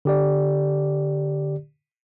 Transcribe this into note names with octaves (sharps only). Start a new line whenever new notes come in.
D3 G4 D5